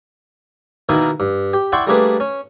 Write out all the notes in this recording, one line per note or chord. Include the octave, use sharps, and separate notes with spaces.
B2 D#3 A#3 D#4 E4
G2
G4
E4 D5 F#5 G5 C6 C#6
G3 A3 A#3 D4 G#4 B4
C#4